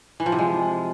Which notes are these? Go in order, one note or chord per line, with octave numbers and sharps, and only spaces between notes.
E3
F3
C3
G#3